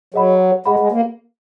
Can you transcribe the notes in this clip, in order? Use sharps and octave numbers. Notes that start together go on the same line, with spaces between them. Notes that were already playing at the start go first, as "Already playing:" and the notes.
F#3 G#4 D#5 F#5 B5
G#3 G#4 D#5 F#5 B5
G#3
A#3